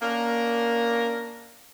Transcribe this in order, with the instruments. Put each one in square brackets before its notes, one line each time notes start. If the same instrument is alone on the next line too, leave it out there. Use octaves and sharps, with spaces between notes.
[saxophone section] A#3 C#4 D4 A#4